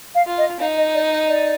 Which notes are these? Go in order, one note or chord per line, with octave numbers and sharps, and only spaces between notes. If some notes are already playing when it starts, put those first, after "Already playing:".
F5
F4
D#5
D#4 F5
D#5
D5
D#5
D5